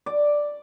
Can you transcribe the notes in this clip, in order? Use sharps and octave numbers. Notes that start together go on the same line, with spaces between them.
D5